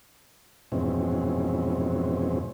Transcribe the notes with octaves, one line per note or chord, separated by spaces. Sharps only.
F2 G#2 B2 E3 C4 C#4